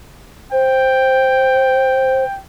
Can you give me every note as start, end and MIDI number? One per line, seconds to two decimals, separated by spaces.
0.52 2.24 72
0.52 2.39 79